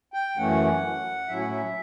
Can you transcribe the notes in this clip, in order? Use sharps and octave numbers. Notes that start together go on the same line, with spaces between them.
G5
F#2 E3 A3 C#4 F#5
A2 F#3 C#4 E4 E5
F#5
E5